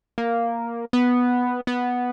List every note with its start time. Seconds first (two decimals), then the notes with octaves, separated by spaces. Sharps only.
0.18 A#3
0.93 B3
1.67 B3